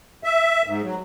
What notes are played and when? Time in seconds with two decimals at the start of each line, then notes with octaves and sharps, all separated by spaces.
0.24 E5
0.67 G#2
0.84 F#3